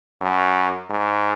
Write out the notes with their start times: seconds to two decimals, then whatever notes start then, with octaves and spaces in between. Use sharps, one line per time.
0.21 F#2
0.90 G#2